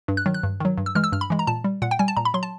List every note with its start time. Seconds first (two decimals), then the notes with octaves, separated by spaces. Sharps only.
0.08 G2
0.17 F#6
0.26 D#3 F#3
0.34 F#6
0.43 G2
0.60 D#3 F#3
0.78 G2
0.86 E6
0.95 E3 G#3 F6
1.04 E6
1.12 G2 F6
1.21 B5
1.30 E3 G#3
1.39 A#5
1.47 A#2 A5
1.64 G3
1.82 A#2 F#5
1.91 G5
1.99 G3 G#5
2.08 A5
2.17 A#2 A#5
2.25 B5
2.34 F#3 C6
2.43 A5